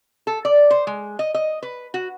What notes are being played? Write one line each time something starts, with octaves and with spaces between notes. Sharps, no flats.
A4
D5
C5
G#3
D#5
D#5
B4
F#4